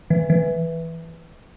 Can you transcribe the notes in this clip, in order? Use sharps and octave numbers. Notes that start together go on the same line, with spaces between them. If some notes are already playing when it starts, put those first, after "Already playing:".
E3
E3